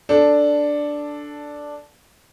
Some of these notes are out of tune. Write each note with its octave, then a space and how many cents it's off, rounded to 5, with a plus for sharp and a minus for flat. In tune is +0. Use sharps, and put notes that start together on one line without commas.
D4 +0 A4 +0